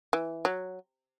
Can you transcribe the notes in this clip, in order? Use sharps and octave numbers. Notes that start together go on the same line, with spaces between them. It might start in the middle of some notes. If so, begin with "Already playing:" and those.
E3
F#3